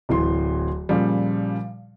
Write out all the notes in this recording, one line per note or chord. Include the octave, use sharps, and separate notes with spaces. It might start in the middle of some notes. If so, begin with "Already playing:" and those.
D1 E3 C6
A#2 C#3 F3 G3